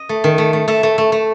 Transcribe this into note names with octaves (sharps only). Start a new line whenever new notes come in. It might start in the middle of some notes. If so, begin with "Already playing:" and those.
Already playing: D#5
A3
D#3
A3
A3
A3 E5
A3
A3
A3